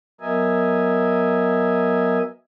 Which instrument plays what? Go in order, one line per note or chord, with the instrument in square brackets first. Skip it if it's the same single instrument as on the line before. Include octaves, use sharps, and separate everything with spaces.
[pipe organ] F#3 B3 A#4 D#5 E5 G#5